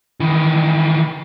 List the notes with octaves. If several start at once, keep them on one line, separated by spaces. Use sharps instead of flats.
D#3 E3